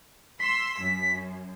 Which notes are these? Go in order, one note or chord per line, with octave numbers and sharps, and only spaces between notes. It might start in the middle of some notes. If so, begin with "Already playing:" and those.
C6 E6 B6
F#2